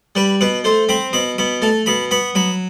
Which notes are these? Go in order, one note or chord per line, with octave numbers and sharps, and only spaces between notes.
G3 B4
B2 B4
A3 C5
C4 B5
B2 B5
B2 B5
A3 A5
B2 B5
B3 B5
F#3 B5